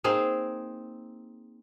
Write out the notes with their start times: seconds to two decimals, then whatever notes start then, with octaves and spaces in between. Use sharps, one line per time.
0.04 A#3 C4 D#4 G#4